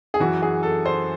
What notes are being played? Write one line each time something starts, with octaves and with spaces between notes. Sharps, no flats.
G#4
F#2 E3 F#4
G#4
A4
C5